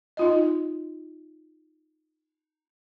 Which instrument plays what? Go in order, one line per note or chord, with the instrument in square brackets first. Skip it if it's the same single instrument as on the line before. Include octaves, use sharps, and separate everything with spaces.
[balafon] D#4 F4 D#5